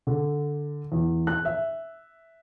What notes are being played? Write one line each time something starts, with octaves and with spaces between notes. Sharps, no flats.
D3
E2
F#6
E5